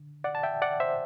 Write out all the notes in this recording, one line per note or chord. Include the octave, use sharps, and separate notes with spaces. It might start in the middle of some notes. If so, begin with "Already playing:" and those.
Already playing: D3
D5 F#5
A5
E5 G5
D5 F#5
C5 E5